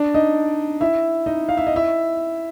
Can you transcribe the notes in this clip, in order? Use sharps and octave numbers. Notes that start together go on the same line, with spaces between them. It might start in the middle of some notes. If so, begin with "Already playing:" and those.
Already playing: D4 D5
D#4 D#5
E4 E5
D#4 D#5
F5
E5
D#5
E4 E5